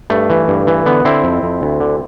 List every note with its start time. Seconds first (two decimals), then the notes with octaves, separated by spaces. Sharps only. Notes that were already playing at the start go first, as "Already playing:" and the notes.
0.10 G2 A3
0.30 E3
0.48 G2
0.67 E3
0.86 D3 B3
1.05 D3 C4 E4
1.24 F2
1.43 F2
1.62 D2
1.80 D3